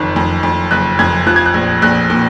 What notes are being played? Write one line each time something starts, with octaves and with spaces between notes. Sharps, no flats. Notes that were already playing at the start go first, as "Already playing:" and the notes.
Already playing: F#1 F2 D#3 F#6
F2
F2
F#1 F#6
F2 G#6
F3 F#6
G#6
F#6
A#1
A#1 F#6
A#2